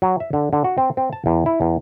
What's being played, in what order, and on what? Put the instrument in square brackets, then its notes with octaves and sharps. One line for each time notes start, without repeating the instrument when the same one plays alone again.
[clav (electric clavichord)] F#3
E5
D3
D3
F#4
C4
C4
A5
E2
E4
E2